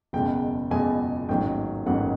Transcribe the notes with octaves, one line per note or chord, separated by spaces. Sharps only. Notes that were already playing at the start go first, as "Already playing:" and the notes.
F#1 E2 B2 G#3 G5
F#1 E2 B2 G#3 G#5
A1 G#2 D#3 F#3 A#3 G5
A1 G#2 D#3 F#3 A#3 F#5